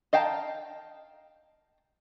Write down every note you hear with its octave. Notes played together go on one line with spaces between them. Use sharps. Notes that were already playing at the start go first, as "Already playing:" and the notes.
D#5 F5 G5 A5 A#5